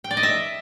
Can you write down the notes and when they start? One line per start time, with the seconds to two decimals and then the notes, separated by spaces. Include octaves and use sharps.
0.04 G5
0.11 D5
0.17 D#5
0.23 E5